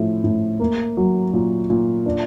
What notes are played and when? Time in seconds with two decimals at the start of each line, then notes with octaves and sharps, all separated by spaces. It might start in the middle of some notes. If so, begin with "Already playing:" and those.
Already playing: A2 F3
0.24 A2
0.60 A#3
0.97 F#3
1.33 A#2
1.70 A#2
2.06 D4